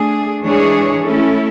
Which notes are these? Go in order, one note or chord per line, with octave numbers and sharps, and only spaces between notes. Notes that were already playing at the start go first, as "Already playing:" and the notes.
Already playing: A3 D4 G#4
E3 G#3 D4 G#4 C#5
A3 C#4 E4 A4